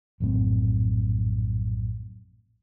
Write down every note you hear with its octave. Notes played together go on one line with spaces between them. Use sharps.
A#1 F#2 A2 C4